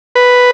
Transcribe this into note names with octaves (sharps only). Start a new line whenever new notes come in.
B4